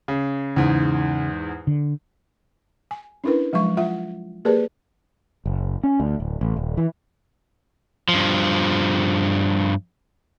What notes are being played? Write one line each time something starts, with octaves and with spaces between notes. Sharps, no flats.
C#3
E2 G#2 C#3
D3
G#5
C#4 D4 E4 A#4 B4
F3 F#3 G#3 C#6
F4 E5 F#5
A#3 G4 G#4 A#4 B4 D5
F#1
C#4
D2
D1
A1
D#1
E3
G2 F3